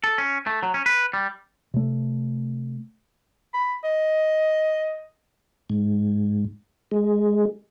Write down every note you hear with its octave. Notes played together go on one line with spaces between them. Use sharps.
A4
C#4
A3
F#3
C#4
B4
G3
C3 A3
B5
D#5
G#2
G#3